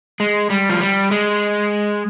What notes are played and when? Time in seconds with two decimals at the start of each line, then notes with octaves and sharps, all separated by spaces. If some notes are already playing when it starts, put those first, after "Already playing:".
0.20 G#3
0.50 G3
0.70 F3
0.81 G3
1.11 G#3